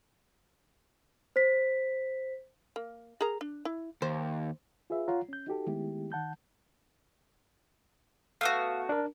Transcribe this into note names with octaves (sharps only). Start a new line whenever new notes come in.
C5 B6
A#3
G#4 A#4 A#5
D4
E4
D#2 C5
F4 G#4 B4 E5
F4 C#5 F#5 A#5
C#4 G6
D#4 F#4 G4 A4
D#3 G#3 A3 B3 E4 G4
D#3 F#5 A5 G6
A3 B3 F#4 F5
D4 A#4